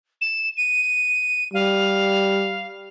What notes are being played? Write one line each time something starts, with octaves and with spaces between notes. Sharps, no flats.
E7
D#7
G3 F5